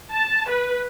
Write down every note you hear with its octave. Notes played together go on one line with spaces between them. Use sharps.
A5
B4